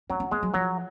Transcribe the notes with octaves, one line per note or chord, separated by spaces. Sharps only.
F#3 C#4
C#4
G#3 B3
F#3
F3 F#3